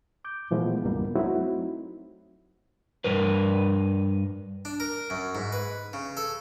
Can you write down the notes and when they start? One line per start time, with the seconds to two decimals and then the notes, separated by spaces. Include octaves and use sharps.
0.25 D6 G6
0.51 A#2 E3 F3 G#3 A3 B3
0.84 C#2 G2 G3 A#3 B3
1.16 F#3 A3 C4 D#4 E4 F#4
3.04 G2 A#4 B4
4.65 D4
4.80 A#4
5.10 F#2
5.35 G#2
5.52 B4
5.93 C#3
6.17 A4